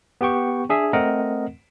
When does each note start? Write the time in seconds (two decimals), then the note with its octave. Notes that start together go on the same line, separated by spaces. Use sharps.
0.21 B3 G4 G5 C#6
0.69 D4 G#4 E5
0.93 A3 C4 A#4 D#5 F#5